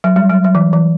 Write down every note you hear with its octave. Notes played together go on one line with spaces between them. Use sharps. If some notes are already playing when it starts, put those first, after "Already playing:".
F#3
G3
F#3
F#3
E3
E3